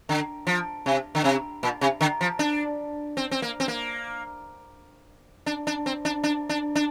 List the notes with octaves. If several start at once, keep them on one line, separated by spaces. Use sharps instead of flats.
D3
F3
C3
D3
C3
A#2
C3
D3
F3
D4
C4
C4
A#3
C4
A#3
D4
D4
C4
D4
D4
D4
D4